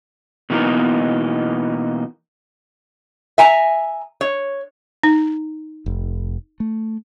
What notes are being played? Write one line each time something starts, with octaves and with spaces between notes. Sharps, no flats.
B2 E3 A#3 B3 D#4
E5 G#5 A#5
C#5
D#4
F1
A3